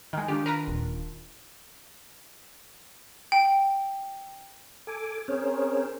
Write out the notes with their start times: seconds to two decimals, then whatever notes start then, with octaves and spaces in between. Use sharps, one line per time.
0.13 D#3 G#3
0.28 D#3 D4 F4 G4
0.46 A#4 B4 A#5
0.68 D#1
3.32 G5
4.87 A4 G#5 D6
5.28 C4 C#4 G#4 A#4 C5 C#5